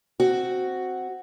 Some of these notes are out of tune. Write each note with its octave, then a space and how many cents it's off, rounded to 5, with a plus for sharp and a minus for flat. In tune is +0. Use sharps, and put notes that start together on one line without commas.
C4 +0 F#4 +0